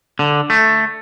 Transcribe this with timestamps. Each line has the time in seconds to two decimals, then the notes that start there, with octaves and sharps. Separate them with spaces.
0.19 D3
0.50 A3